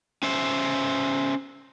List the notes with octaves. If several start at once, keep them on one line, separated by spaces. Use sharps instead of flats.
C#4 C5 E5